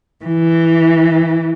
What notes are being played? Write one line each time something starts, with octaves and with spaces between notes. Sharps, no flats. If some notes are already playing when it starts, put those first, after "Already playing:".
E3